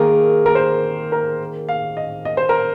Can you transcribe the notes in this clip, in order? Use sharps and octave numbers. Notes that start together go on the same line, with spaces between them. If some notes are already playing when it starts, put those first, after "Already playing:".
Already playing: D#3 A#3 G#4 A#4
A#4
C5
A#4
F5
D#5
D#5
C5
A#4